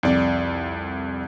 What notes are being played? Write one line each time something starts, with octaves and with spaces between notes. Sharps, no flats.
C2 F2 D5